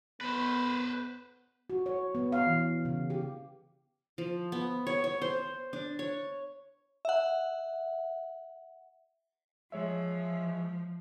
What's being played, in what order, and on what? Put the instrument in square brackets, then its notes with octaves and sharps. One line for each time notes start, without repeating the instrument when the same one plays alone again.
[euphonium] B3 [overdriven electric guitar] B4 C5
[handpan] F#4
C#5
B3
F5
E3
C#3
G4
[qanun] F3
B3
C#5
C#5
C5
D4
C#5
[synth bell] E5 F#5
[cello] F3 [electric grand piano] G#3 C#5 E5